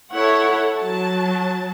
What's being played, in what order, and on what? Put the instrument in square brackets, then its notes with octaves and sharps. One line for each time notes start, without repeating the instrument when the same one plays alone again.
[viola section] E4 A4 C#5 F#5
F#3 A5